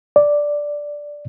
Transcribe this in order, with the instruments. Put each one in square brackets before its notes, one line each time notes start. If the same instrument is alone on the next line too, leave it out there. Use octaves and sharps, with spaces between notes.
[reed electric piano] D5